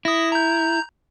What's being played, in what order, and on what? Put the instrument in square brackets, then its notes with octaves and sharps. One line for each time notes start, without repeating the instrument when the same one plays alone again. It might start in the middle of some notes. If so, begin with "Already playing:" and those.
[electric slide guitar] E4 [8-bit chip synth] D#6 A#6
[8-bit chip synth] A#5 G6